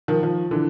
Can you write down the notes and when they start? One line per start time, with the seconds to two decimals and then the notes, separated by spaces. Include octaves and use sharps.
0.08 D#3 F3
0.23 D#3 F3
0.51 D3 E3